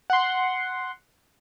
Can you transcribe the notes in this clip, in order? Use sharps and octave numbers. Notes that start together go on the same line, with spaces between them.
F#5 C6